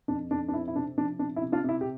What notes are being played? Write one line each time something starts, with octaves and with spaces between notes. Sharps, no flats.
F2 D4
F2 D4
D4
C4 E4
E4
C3 D4
F3 D4
C3 D4
E4
C3
D4 F4
C3 E4
G4